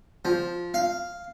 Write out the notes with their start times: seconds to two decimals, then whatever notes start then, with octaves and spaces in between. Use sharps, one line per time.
0.25 F3
0.74 F5